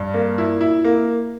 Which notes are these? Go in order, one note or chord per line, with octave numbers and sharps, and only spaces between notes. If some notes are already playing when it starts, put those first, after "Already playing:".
Already playing: G2
A#3
E4
E4
A#3